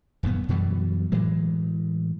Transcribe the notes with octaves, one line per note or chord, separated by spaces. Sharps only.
D#1 F#2 A2 B3
F#2 B2 E3 G3
A2 E3 F#3 G#3